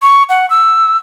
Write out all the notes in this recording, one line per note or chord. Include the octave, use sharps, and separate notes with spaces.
C#6
F#5
E6